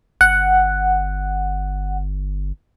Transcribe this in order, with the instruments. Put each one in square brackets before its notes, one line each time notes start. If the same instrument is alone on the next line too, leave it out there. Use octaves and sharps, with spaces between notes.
[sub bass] G1 [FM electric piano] F#5